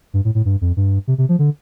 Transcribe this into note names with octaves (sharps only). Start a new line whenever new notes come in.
G2
A2
A2
G2
F2
G2
C3
C3
F3
D3